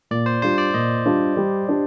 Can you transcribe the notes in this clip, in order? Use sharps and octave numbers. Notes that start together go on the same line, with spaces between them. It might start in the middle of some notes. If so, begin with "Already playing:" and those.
A#2 D5
C5
G3 D4 F4 C5
D5
A#2 D#5
G3 D4 F4
G3
D4 G4